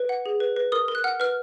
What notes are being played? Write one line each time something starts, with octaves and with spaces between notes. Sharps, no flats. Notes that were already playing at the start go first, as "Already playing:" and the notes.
Already playing: B4
F#5
G#4
B4
B4
A#4 D#6
A#4
F#6
F#5 F6
B4 F6